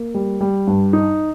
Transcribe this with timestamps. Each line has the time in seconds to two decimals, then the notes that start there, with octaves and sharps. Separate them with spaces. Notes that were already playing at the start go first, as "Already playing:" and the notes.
Already playing: A#3
0.14 G3
0.41 G3
0.67 G2
0.93 D#4